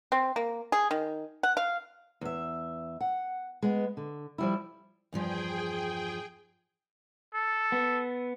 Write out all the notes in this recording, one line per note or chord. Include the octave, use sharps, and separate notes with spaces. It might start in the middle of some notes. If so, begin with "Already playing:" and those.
C4
A#3
G#4
D#3
F#5
F5
E2 E5
F#5
G#3 B3
D3
F3 G3 E4
E2 G2 F3 G#4 G5
A4
B3